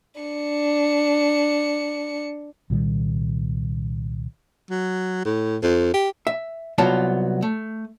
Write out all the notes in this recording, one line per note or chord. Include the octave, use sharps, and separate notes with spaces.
D4 C#7
C2 A#2 D#3 G3
F#3
A2
F2
G4
E5
C2 F#3 B3 F4 A5
A3